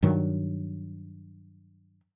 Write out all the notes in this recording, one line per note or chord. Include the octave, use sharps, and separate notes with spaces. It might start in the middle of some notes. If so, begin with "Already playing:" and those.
G2 D#3 F#3